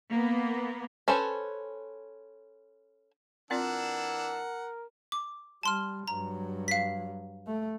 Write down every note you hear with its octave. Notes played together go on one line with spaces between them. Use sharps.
A#3 B3
C#4 A4 B4 C5 G#5
E3 C4 D4 F4 A#4 D5 F#5 E6
D6
G3 A5 C6 F6
G2 F#3 A#5
F5 B6
A3